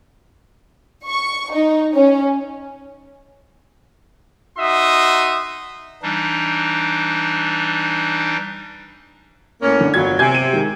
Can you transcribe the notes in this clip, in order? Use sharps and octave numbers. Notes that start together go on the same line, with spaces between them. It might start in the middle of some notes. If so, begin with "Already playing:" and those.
C#6
D#4
C#4
D#4 F#4 E5 C6 D#6
E3 G3 D4 D#4
A2 A#3 C#4
D3
G1 F2 F#3 F#4 G#6
C3 G#5 G6 G#6
D#7
D#3 G#3